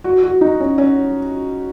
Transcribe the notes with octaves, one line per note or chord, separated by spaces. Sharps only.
F#4
F#4
D#4
C#4
C#4